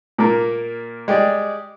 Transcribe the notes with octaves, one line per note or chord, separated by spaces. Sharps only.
A#2 A#3
G#3 G4 D5